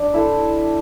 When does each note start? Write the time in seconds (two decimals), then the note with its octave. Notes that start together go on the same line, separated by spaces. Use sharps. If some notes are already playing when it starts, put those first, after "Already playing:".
Already playing: D4 D5
0.14 E4 A4 C5